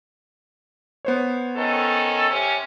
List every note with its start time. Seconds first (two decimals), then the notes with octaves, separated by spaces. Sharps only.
1.05 B3 C5 C#5
1.56 D#3 C#4 A4
2.29 C3 C#4